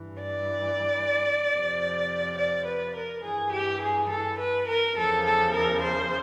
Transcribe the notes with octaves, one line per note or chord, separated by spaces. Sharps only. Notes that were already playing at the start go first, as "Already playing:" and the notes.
Already playing: G2 E3
D5
F2 C3 F3
D5
B4
A#4
G2 E3 G#4
G4
G#4
A4
B4
A#4
E2 C#3 F3 A4
A4
A#4
C5